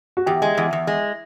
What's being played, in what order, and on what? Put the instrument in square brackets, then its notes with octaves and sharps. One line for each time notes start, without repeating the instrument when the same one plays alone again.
[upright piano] F#4
[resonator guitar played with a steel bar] E2 [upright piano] G4
[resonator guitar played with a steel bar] G#3
E2
E2
G#3